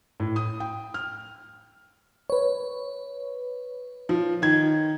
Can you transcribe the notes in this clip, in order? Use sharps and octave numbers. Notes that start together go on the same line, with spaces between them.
A2
D#6
G5
F6
B4 C#5
F3
D#3 G#6